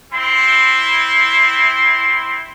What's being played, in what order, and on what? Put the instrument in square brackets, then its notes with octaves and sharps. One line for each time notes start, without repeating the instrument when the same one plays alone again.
[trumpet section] C4 E4 C6